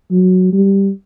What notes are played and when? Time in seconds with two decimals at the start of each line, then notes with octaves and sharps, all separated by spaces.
0.11 F#3
0.52 G3